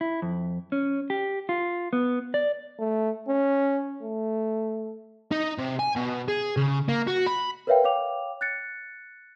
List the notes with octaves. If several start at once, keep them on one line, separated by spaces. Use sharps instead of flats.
E4
F2
C#4
G4
F4
B3
D5
A3
C#4
A3
D#4
C3
G#5
B2
G#4
C#3
A#3
F#4
B5
A#4 B4 C#5 E5 F5 G5
C#5 F5 G5 D6 F7
F#6 A6 C#7